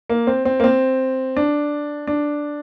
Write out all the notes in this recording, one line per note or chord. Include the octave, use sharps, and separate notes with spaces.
A#3
C4
C4
A#3
C4
D4
D4